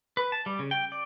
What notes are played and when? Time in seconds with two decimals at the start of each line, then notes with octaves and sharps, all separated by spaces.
0.17 B4
0.32 A5
0.46 G3
0.59 C#3
0.71 G5
0.92 D5